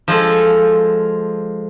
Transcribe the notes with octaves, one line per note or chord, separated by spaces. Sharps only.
F3 G#3 F4 A4